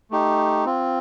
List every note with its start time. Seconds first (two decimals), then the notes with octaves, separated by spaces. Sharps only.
0.11 A3 D#4 G4
0.65 C4 F4